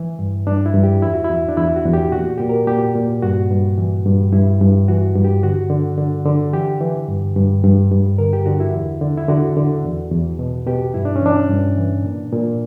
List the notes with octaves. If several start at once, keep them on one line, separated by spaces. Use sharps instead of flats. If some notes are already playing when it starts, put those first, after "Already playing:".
Already playing: E3 E4
G2
G2 D4
E4
G2
G4
E2 E4
F#4
E4
E2
D4
E2 E4
F#4
E2
G4
A#2 F#4
A#2 G4
A#4
A#2 G4
A#2
G2 F#4
G2
E3
G2
G2 E4
G2
E3 F#4
G2
G4
D3 F#4
D3
D3
D3
E3 G4
E3
G2
G2
G2
G2
D3 A#4
G4
D3 F#4
E4
E2
D3
E4
D3 F#4
D3
E2
E2
B2
B2 G4
G2 E4
D4
C#4
E3 D4
G2
E3
A#2
A#2